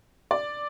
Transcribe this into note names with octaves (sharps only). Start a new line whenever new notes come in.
D5